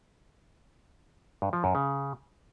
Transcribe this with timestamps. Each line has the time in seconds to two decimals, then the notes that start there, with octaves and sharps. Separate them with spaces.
1.42 G2
1.53 F3
1.64 F#2
1.75 C#3